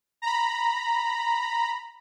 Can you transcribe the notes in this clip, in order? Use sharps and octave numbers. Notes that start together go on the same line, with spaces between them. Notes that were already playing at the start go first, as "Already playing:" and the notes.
A#5 B5